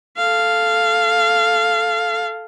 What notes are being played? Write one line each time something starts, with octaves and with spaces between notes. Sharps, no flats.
A4 F5